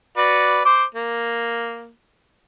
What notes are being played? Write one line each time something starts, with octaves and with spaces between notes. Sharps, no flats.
F#4 B4 D5
C5 D6
A#3